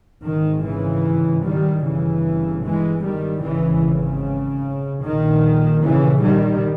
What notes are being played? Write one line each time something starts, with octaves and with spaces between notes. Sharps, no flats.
G#1 G#2 D#3
C#3 E3
D#3 G3
G1 G2 C#3 E3
E3 G#3
D#3 G3
G#1 G#2 C#3 E3
C#3
A#1 A#2 D#3
C#3 E3
D#3 G3